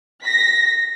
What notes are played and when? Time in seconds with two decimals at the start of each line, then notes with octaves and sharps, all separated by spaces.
0.25 A#6 B6